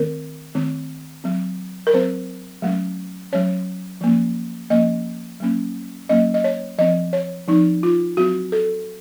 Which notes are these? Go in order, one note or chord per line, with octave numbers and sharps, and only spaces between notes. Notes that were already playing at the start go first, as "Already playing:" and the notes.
Already playing: D#3 A3 C4 A#4
D#3 A3 C4
F#3 C4
A#4
F#3 C4 C5
F#3 A3 C#4
F#3 A3 C#4 C#5
F3 A#3 C#4
F3 A#3 C#4 D#5
F#3 A#3 C#4
F#3 A#3 C#4 D#5
D#5
C#5
F3 C4 D#5
C#5
F3 C4 D#4
F4
F#3 C4 F#4
A4